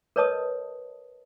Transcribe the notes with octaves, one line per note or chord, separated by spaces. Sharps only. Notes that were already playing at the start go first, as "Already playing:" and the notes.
A#4 B4 C#5 D#5 A5 D#6